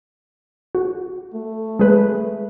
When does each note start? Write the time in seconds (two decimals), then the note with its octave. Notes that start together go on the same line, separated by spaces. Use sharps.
0.75 F#4
1.34 A3
1.79 G#3 G#4 B4